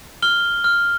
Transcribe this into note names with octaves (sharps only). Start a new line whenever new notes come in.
F6 G7
F6